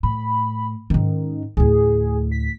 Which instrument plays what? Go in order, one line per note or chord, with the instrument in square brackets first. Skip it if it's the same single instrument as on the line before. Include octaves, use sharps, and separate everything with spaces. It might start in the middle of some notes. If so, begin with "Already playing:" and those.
[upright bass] A2 [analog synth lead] B5
[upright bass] G#2 C#4 [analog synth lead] D#3
[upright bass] D2 A2 [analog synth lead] G#4
[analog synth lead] B6